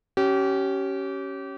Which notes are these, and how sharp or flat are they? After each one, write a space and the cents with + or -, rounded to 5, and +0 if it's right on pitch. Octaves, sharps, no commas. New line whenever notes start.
C#4 +0 G4 -30